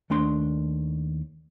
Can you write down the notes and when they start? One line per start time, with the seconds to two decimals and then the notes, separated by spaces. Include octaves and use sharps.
0.10 D#2 A3 D4 C6